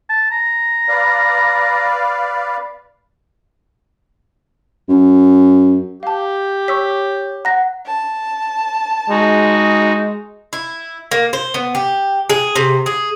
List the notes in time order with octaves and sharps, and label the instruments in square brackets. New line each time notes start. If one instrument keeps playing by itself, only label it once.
[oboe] A5
A#5
[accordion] B4 D5 F5
[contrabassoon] F#2
[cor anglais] G4 [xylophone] F5 A5
[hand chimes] C#5 [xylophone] C#6 E6 B6
[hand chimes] F#5 [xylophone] A#5 A#6
[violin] A5
[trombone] G#3 [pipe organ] D#4 F#4
[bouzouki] E4
A#3
C5
B3
G4
G#4
C3
G#4